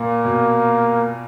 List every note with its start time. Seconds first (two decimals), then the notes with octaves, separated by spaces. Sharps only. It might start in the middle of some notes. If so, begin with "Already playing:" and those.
Already playing: A#2 A#3
0.25 B2